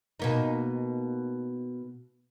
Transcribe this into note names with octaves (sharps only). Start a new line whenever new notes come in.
B2 A#3 D#4